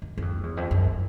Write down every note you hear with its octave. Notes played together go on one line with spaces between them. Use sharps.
F#2
F#2
F2
E2
F2
F#2